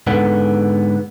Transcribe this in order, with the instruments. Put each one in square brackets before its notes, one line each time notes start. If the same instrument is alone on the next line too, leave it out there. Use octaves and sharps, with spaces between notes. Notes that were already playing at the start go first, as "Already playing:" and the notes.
[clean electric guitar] G#2 D3 B3